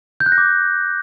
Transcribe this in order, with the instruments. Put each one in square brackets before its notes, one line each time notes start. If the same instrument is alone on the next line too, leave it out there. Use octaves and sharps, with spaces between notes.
[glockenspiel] G6
F#6
A#6
D6